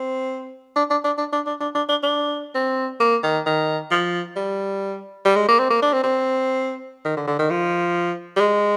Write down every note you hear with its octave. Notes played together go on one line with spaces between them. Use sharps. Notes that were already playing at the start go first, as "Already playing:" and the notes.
Already playing: C4
D4
D4
D4
D4
D4
D4
D4
D4
D4
D4
C4
A#3
D#3
D#3
F3
G3
G3
G#3
A#3
C4
A#3
D4
C4
C4
D#3
D3
D3
D#3
F3
G3
G#3